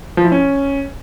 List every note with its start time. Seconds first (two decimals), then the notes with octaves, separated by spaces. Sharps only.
0.17 F3
0.25 E4
0.32 C#4